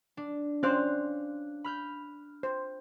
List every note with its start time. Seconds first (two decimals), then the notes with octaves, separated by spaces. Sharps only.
0.17 D4
0.63 C#4 C5 D5 F5 F#6
1.64 B5 F6 G6
2.43 C5